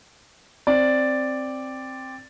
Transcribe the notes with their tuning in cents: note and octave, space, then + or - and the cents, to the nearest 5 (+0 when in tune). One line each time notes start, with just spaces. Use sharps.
C4 +5 D5 +0